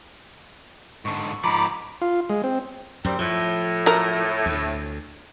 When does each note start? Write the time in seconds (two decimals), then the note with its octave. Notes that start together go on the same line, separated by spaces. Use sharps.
1.05 G#2 D3 C#6
1.44 G#2 F3 A#5 B5 D6
2.02 F4
2.29 G#3
2.44 C4
3.04 F#2 D#3 G3 C4
3.19 A2 F3
3.86 F#3 A3 A#4
4.46 D2